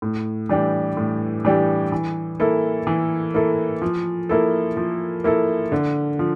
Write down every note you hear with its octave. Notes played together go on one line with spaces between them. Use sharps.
A2
E3 G3 D4 G4
A2
E3 G3 D4 G4
E3
A#3 E4 A4
E3
A#3 E4 A4
F3
A#3 E4 A4
F3
A#3 E4 A4
D3
F3